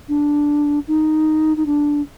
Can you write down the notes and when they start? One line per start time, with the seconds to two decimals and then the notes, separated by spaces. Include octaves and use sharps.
0.08 D4
0.88 D#4
1.57 D#4
1.66 D4